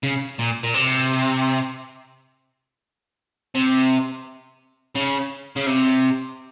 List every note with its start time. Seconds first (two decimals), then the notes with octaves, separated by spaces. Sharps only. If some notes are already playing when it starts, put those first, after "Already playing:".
0.03 C#3
0.39 A#2
0.63 A#2
0.74 C3
3.55 C3
4.96 C#3
5.56 C#3
5.66 C3